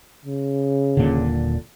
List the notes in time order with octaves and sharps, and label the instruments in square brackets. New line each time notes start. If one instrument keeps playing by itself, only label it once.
[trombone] C#3
[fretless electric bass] D#1 A#2 D3